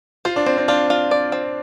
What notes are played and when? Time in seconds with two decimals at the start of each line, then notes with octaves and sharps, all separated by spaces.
0.25 F4 C5
0.36 D4
0.46 C4 C5
0.58 C4
0.68 D4 F4
0.90 F4
1.11 D5
1.32 C4